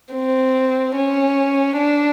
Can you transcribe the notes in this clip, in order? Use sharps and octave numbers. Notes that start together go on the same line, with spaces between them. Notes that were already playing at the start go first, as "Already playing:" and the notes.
C4
C#4
D4